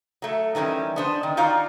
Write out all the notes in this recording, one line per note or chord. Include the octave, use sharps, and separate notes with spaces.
F#3 A3
D#3 E3 G3 C#4
B3 D4 C5
D#3
D#4 F4 F#4 D5 F5